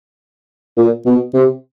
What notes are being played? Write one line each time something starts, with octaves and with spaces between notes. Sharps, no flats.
A#2
B2
C3